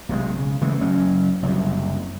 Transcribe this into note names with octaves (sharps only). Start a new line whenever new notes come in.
B1 C3 D#3 G#3
C#3
C#3 E3 G#3 A3
F#1 F#3 C#4
F#1 C2 F#2